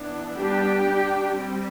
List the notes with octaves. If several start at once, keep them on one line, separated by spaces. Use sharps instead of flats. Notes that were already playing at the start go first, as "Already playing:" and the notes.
Already playing: E3 B3 D4
G3 B3 D4 G4 G5
G3 D4
G3 C4